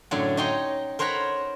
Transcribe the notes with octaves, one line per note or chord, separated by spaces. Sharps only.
F#2 A2 D3 C#5 D5
D#4 C#5 D#5 G5 A#5 C6
A#4 C5 C#5 F#5 A#5 B5